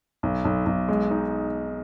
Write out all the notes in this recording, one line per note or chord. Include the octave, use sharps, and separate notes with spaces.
B1
B1
B1
G#3
D#4